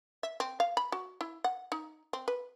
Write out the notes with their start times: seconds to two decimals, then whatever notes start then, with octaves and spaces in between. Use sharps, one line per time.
0.23 E5
0.40 C4
0.60 F5
0.77 B5
0.92 F#4
1.21 E4
1.44 F#5
1.72 D#4
2.13 C4
2.28 B4